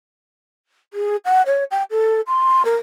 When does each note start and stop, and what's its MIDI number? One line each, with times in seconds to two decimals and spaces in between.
0.93 1.16 68
1.25 1.42 78
1.46 1.64 73
1.71 1.83 79
1.91 2.21 69
2.27 2.65 84
2.65 2.76 70